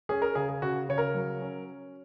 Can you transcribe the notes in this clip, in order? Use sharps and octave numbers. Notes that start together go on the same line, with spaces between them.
C#4 G#4
A#4
C#3 G#4
G#4
C#3 F#4
C#3 C#5
A#4
F#3
C#4